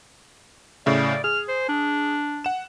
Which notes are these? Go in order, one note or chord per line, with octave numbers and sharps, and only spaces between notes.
A2 C#3 D5 E5
G#4 F6
C5
D4
F#5 E7